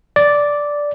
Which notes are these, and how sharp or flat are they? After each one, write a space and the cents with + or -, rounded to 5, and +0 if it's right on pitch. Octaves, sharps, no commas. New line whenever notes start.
D5 -5